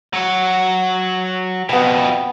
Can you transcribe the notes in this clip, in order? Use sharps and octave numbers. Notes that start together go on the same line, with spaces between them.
F#3 C#5
F2 B2 B3 G5